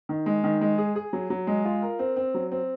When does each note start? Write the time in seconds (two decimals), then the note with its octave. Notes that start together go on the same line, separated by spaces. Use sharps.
0.09 D#3
0.26 G#3
0.44 D#3
0.61 G#3
0.78 G#4
0.96 G#4
1.13 F#3
1.30 F#3
1.47 G#3
1.65 F4
1.82 A#4
1.99 C4
2.16 C4
2.34 F#3
2.51 C4